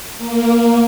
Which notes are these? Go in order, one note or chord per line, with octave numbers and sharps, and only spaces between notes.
A#3